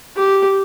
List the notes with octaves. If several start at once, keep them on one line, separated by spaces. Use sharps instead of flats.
G4